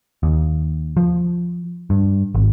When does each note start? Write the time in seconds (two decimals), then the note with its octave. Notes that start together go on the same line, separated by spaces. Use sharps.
0.23 D#2
0.97 F3
1.90 G2
2.35 G#1